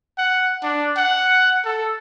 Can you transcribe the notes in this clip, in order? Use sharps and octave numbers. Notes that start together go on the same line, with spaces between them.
F#5
D4
F#5
A4